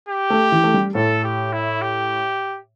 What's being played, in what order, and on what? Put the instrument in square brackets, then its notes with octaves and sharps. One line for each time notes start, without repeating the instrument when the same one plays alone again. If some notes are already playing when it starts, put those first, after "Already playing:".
[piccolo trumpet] G4
[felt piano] A3
E3
A3
G3
[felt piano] A2 [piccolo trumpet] A4
[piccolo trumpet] G4
E4
G4